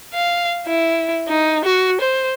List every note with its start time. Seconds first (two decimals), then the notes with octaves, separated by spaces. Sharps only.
0.13 F5
0.67 E4
1.28 D#4
1.64 F#4
2.00 C5